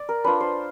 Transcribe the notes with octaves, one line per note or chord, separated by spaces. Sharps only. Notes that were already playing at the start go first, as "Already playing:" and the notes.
Already playing: D5
A#4
D4 F4 B4
C5